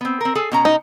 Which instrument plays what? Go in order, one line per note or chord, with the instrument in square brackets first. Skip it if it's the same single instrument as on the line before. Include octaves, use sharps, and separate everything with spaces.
[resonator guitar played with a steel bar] B3 C4
C4 A#4
G#4 A4 G#5
B2 C#4 A#5
[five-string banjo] D#4